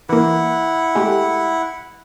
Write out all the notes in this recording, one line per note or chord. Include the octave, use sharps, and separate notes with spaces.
E3 A#3 E4 F#5
G#3 A3 G4